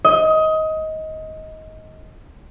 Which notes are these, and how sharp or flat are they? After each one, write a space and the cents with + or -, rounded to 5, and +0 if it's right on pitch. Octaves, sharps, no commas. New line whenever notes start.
D#5 +20